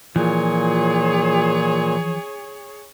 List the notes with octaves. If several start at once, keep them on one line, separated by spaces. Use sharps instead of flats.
A#2 E3 F3 G#4 C#5